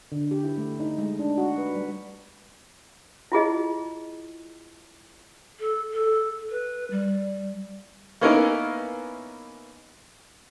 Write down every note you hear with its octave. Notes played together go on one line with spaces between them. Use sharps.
D3
G4
E4
A3
D#4
G#3
D4
F#4
B4
G3
E4 F4 G#4 D#5
A4
A4
B4
G3
A#3 B3 C#4 D#4 E4 A#4